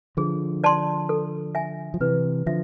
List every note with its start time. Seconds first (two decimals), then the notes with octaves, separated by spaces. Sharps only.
0.17 D3 F3 G#4
0.64 D5 A5 C6
1.09 A4
1.55 E5 G#5
1.94 F3
2.00 C3 E3 B4
2.46 D3 F3 E5